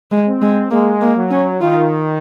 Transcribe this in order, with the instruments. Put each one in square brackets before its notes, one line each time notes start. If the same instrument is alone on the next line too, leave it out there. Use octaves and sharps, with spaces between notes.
[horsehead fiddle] G#3
[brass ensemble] C4
[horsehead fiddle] G#3
[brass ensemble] G#3 [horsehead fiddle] A#3
[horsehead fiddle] A#3
[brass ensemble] F#3
[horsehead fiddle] C#4
[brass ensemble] D#3 [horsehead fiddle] F4